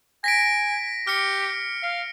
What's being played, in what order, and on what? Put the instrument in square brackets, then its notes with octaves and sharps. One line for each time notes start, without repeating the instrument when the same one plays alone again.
[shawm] G#5 [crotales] A#6 B6 D7
[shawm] G4 [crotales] F6 C#7
[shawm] F5